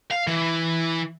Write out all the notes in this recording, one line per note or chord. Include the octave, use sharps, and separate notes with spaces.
F5
E3